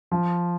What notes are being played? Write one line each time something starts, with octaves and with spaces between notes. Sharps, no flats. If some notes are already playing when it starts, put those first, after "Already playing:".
F3